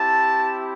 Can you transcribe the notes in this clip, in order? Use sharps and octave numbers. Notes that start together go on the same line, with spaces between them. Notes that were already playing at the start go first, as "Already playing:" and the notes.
Already playing: C4 E4 G4 A5